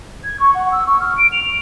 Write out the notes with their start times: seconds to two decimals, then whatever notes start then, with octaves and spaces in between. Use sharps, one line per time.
0.24 G#6
0.39 C#6
0.54 F#5
0.71 E6
0.86 C#6
1.00 F6
1.17 D7
1.32 F7